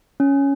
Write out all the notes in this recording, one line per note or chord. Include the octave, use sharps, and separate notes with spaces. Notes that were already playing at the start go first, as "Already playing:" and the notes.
C#4